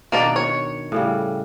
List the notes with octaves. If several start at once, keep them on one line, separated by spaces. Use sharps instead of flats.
B2 D#3 A#3 D4 D#4 D5
C#5
A2 C#3 G3